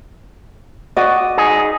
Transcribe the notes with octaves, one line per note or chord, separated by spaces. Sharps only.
F#4 D5 D#5
D#4 G#4